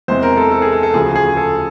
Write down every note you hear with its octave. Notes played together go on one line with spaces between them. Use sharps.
E2 C3 E3 G#3 C5
A#4
A4
A4
G#4
A4
A4
D2 C#3 F3 G#4
G#4
A4